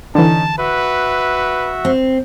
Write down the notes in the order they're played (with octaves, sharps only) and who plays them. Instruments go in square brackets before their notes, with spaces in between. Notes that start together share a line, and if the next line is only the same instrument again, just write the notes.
[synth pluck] D3 E3 [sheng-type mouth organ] C#4 D#4 [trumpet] A5
[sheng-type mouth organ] F#4 E5 [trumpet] B4
[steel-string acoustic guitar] C4